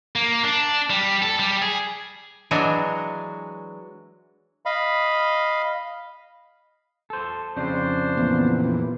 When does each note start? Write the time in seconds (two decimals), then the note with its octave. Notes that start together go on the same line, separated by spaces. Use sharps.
0.16 A#3
0.44 D4
0.90 G3
1.22 A4
1.39 G3
1.62 G#4
2.51 E3 F#3 G#3 D4 F#4 G#5
4.65 D#5 F5 B5
7.10 A4 C5
7.57 F2 C#3 D4 C5
8.17 A#2 E3 B3